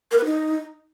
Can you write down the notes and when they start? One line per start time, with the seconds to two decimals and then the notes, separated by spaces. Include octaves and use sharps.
0.11 A#4
0.18 B4
0.25 D#4